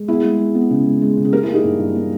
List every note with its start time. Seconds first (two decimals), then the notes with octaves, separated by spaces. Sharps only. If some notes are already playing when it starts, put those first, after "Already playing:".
Already playing: G#3
0.08 B3 E4 G#4
0.24 G#3
0.40 G#3
0.55 B3
0.71 C#3
0.86 G#3
1.02 G#3
1.17 C#3
1.25 G#4
1.33 A#3 G4 A#4
1.43 E4 G#4
1.48 A#3
1.54 D#4 G4
1.64 G2
1.79 G2
1.95 A#3